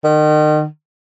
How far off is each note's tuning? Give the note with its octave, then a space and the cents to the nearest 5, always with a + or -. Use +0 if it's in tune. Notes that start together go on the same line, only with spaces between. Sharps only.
D#3 -35